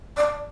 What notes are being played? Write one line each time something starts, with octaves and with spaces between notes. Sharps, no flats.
D5